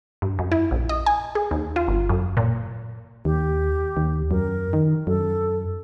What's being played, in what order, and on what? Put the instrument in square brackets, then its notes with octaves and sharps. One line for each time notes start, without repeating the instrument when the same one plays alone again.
[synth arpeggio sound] G2
F#2
E4
A#1
D#5
G#5
G#4
D#2
F4
G1
F#2
A#2
[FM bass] D#2 [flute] G4
[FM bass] D#2
[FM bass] F#2 [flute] A#4
[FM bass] D#3
[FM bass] F#2 [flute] A4